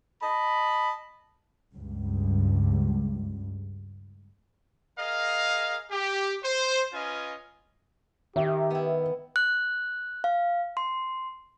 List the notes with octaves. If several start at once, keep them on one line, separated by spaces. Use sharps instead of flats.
D#5 A5 B5
C#2 G2
G#4 A#4 D#5 F5
G4
C5
C#4 F4 B4 D#5 G#5
D#3 G4 E5
B3 E4
F#6
F5
C6